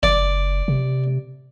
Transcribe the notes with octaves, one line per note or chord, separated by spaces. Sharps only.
F#1 D5 D6
C3